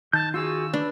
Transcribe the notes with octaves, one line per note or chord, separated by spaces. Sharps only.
D#3 A5 G6
F4 F#4 G#4 E6
D4 B4